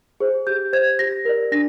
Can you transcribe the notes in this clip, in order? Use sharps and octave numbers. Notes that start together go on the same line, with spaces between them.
G#4 C5
G4 G6
C5 G#6
G4 A#6
A#4 D5
D4 A#6